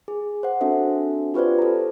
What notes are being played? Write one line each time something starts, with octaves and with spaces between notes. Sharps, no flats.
G#4
C5 F#5
C4 D4 F#4 A4 E5
F4 G4 B4 C5 D5
A4 A#5